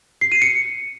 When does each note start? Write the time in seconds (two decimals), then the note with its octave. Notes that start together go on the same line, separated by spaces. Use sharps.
0.21 C7
0.32 D#7
0.42 C#7